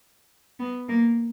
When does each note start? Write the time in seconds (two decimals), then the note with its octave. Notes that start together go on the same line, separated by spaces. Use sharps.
0.59 B3
0.89 A#3